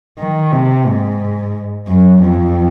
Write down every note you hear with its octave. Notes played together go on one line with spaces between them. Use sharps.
D#3
C3
G#2
F#2
F2